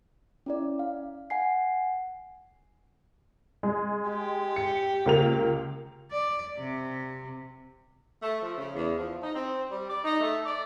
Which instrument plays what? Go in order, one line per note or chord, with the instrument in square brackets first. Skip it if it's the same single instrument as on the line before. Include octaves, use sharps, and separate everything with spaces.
[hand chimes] C#4 E4 D5
F5
F#5 G#5 C7
[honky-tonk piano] G#3
[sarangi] G4
[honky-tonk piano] C#7
C#2 A#3 F7
[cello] D5
C3
[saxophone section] A3
F3
C#3
E2
F3
D#4
C4
G3
D5
D#4
A3
D5